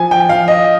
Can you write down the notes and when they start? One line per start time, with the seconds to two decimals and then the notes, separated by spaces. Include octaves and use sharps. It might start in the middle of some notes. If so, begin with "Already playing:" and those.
Already playing: F3 G#5
0.11 G5
0.29 F3 F5
0.48 D#5